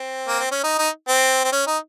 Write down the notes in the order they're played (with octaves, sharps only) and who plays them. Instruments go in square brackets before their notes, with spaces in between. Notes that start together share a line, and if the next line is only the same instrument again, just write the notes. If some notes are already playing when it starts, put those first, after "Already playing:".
Already playing: [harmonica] C4
A#3
C4
C#4
D#4
D#4
C4
C4
C#4
D#4